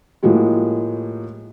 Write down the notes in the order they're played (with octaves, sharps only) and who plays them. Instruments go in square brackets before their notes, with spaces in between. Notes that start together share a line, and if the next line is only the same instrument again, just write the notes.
[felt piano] A2 F3 G#3 A#3 F#4 G4